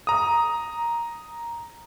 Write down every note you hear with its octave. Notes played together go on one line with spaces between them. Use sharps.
A#5 D#6